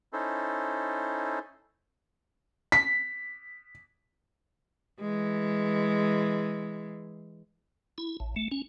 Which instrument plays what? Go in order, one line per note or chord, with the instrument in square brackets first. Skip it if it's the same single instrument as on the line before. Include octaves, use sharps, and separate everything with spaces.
[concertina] C#4 D#4 E4 A4 C5
[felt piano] B6
[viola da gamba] E3 G#3
[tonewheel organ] E4
A1
A3
C#4